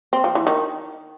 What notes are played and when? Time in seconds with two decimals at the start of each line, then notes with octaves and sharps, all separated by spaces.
0.13 C4
0.24 F3
0.35 E3
0.47 D#3